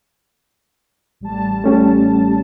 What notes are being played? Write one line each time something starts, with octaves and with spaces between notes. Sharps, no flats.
A1 G3 A5
A3 C#4 G4